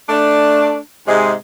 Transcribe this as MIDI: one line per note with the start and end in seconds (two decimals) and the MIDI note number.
0.09 0.77 57
0.09 0.77 62
1.07 1.33 44
1.07 1.33 48
1.07 1.33 56